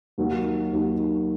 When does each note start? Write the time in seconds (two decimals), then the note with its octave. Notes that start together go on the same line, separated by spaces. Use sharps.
0.18 D#2 D#3 F#3
0.73 D#2 D#3 F#3